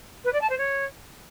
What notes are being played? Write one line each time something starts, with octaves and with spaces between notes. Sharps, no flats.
B4
D5
A5
C5
C#5